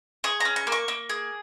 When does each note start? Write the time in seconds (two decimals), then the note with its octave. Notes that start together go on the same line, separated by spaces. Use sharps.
0.24 G#4 C#6
0.40 C#4 A#5
0.56 C#6
0.67 A#3
0.72 C#6
0.88 A#3
1.10 G#4